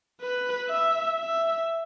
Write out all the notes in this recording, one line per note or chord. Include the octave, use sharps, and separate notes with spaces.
B4
E5
E5